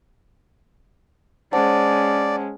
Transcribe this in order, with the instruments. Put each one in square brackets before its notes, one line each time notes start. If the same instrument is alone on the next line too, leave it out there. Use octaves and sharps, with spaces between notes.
[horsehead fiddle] G#3 C#4 [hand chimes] C5 F#5 A5 [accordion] D5